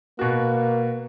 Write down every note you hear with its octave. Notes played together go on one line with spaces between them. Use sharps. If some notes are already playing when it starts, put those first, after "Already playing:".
B2 A#3 F#4